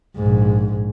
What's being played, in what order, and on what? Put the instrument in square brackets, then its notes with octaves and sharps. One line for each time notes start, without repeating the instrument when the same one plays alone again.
[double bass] A#1 G#2